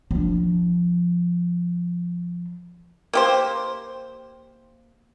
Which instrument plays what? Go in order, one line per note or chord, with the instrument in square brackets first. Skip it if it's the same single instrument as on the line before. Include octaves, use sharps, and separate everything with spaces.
[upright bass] F3 D4
[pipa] A#3 G4 C5